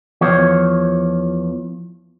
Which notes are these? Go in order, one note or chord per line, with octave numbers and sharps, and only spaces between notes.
E2 F3 C#5